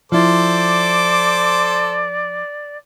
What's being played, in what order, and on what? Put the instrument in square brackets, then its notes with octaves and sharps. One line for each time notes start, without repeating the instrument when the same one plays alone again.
[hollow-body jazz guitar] F3 E4 [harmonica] A4 C5 D6 [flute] D5